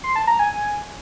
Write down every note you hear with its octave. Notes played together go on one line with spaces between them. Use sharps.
C6
A5
A#5
G#5